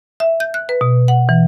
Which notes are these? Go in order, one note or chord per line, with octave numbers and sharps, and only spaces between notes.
E5
G6
F#6
B4
B2
F#5
E3